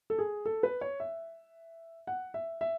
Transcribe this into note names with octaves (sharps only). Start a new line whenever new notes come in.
A4
G#4
A4
B4
C#5
E5
F#5
E5
E5